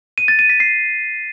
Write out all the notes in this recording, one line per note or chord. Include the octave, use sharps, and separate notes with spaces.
D#7
A6
D#7
B6
C7